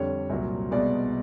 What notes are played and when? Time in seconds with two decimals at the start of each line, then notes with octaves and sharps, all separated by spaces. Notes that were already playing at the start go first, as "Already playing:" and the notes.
Already playing: F2 D3 G3 C#5
0.29 C2 A#2 F#3
0.71 C2 B2 G#3 B3 D5